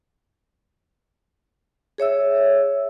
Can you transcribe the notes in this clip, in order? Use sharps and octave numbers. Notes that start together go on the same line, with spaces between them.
G#4 C#5 E5 E6